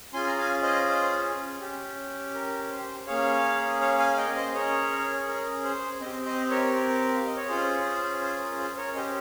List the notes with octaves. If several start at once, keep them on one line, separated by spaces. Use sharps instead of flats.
C#4 F4 G#4 G#5 C6
A#5
F5 G#5
C5 D#5
C5
C#4 G4
A#4
C5
A#3 C#4 G#4 C#5 F5
C#5 F5
F5 G#5
D#5 G5
C5 D#5
C#4 G#4 A#4 C#5
A#4
C5
C4 G4 C5 D#5
C5 D#5
A#4 C#5
A#4
F5
D#5
C#5
C#4 F4 G#4 C5
C5
C5
A#4
C5
A#4 C#5
C#4 G4 C5 D#5